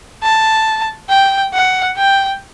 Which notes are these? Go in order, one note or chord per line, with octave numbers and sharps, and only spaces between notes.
A5
G5
F#5
G5